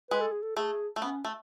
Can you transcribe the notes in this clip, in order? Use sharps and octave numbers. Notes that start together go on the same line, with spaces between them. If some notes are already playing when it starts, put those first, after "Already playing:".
G#3 B4
A4
G#4
A4
A3 G#4
A3
B3 C#4
A3